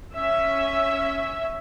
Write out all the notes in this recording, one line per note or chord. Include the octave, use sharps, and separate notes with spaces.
C#4 E5